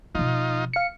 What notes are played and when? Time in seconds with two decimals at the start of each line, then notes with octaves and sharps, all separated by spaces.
0.15 B2 F3 D#4 F4
0.73 F5 C#7